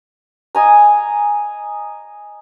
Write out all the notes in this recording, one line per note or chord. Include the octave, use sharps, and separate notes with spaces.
D#5 G#5 A#5